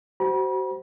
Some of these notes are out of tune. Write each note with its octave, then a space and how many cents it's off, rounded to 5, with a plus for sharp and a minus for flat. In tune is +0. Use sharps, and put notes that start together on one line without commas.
F#4 +30 C5 +0 B5 -40